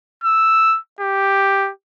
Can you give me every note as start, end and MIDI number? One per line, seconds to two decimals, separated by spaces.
0.24 0.78 88
1.01 1.71 67